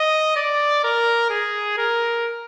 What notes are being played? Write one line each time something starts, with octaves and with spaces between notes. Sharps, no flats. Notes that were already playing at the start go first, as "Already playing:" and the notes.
Already playing: D#5
D5
A#4
G#4
A#4